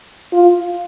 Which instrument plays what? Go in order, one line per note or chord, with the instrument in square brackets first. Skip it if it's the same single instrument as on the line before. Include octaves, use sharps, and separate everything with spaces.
[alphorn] F4